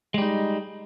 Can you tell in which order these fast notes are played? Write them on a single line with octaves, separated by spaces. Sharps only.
G#3 G3 D#4